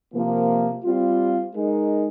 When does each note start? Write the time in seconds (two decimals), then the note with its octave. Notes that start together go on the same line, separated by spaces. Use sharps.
0.14 C3 F3 A#3
0.84 G3 C4 F4
1.53 G#3 D#4 A#4